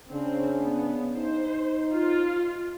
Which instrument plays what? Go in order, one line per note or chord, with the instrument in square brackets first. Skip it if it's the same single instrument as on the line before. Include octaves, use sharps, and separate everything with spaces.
[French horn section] C#3 D4 [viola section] C4
[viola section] B3
[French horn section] D#4 [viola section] C5
[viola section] F4